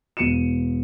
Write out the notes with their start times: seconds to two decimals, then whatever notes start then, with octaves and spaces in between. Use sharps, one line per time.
0.17 E1 C#7 D#7 E7